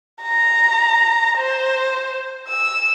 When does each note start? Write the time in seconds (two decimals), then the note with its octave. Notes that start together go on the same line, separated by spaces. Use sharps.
0.23 A#5
1.38 C5
2.48 E6